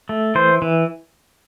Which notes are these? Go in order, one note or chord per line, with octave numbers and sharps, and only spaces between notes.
A3
E3 C5
E3